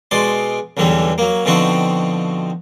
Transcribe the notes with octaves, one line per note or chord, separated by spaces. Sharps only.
B2 G#3 D5 C6
B1 E2 D3 E3 G3
F#3 A#3
B2 D3 F3 C4 D#4 F#4